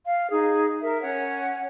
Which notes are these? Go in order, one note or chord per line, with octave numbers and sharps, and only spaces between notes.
F5
D#4 G#4
A#4 E5
C#4 C#5 F#5